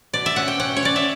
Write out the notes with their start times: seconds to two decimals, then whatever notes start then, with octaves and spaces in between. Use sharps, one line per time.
0.14 B2 D5
0.26 E5
0.36 C#4 F#5
0.48 G5
0.59 C#4 F#5
0.77 C#5
0.83 C#4 D5
0.96 E5